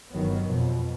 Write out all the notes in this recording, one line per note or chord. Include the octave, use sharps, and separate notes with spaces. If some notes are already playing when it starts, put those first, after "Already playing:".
G1 D#3 F#3 B3
F2 B2